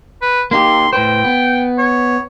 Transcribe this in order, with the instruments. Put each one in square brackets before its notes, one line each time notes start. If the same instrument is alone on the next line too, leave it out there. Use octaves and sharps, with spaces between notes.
[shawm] B4
[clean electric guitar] A#3 D#4 G4 [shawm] C6
[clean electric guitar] A2 B4 C5 [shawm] G5
[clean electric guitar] B3
[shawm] C#5